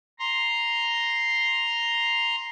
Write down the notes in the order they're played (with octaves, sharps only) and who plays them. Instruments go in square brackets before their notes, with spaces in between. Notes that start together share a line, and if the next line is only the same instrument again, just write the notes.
[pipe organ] A#5 C6